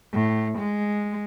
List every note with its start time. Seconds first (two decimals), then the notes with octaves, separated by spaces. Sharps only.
0.13 A2
0.58 G#3